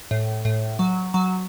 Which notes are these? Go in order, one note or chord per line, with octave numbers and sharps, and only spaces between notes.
A2
A2
F#3
F#3